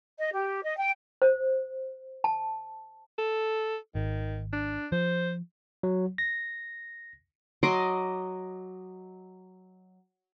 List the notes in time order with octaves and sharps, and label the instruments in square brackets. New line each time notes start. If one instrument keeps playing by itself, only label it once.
[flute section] D#5
G4
D#5
G5
[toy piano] C5
A5
[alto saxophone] A4
[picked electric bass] G#1 [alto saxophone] D#3
[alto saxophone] D4
[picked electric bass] F3 [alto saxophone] C5
[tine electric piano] F#3
A#6
[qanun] F#3 D#5 C6 D6